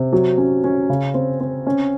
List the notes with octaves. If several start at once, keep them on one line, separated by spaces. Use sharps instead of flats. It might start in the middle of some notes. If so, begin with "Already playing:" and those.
Already playing: C3
F#3
C#4
C#4
C#3
C4
C4
C#4